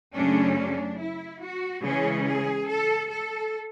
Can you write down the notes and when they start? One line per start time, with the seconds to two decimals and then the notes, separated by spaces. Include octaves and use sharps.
0.15 F#2 C#3 F#3 A3 C#4 D4
0.58 D4
0.99 E4
1.42 F#4
1.84 C#3 E3 G#3 C#4 G#4
2.26 G#4
2.68 A4
3.10 A4